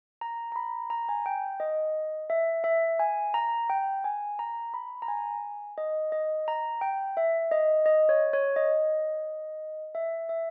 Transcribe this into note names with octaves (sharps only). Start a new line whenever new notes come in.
A#5
A#5
B5
A#5
G#5
G5
D#5
E5
E5
G#5
A#5
G5
G#5
A#5
B5
A#5
G#5
D#5
D#5
A#5
G5
E5
D#5
D#5
C#5
C#5
D#5
E5
E5